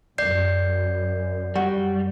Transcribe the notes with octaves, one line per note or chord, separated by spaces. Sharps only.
F#2 D5 G6 C7
G3 F#4